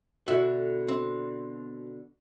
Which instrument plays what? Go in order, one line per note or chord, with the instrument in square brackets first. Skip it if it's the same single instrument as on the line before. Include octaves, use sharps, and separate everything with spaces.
[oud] B2 D3 E4 [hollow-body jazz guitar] F#4 E5
[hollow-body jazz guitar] C4